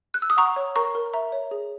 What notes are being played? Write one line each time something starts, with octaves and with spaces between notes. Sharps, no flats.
F#6
E6
D#6
F#5 A#5 C#6
C#5
A#4 A#5 C#6
A#4
E5 A#5
C#5
G#4